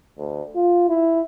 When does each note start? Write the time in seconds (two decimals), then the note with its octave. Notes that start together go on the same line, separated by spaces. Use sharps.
0.18 D2
0.55 F4
0.88 E4